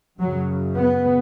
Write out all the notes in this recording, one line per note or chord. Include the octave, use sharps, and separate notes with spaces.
F#2 C#3 F#3
B3